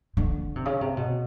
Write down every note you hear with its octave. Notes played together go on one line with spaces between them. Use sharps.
D3
C3
C#3
C3
B2